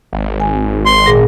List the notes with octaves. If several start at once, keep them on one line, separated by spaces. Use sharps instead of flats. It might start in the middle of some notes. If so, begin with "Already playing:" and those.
G#1
G#5
C6
A#2 G#4 A#6